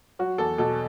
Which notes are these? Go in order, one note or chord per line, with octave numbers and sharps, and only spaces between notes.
F#3 F#4
E2 A4
B2 A4